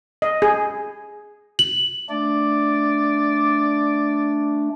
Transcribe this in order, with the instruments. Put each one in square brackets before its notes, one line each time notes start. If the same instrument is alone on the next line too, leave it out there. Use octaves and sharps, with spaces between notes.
[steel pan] D#5
G#4
[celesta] F#7
[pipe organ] A3 D4 [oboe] D5